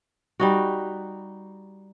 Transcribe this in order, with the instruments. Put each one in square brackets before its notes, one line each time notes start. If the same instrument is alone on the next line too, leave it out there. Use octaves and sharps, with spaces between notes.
[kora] G3 D#4 F#4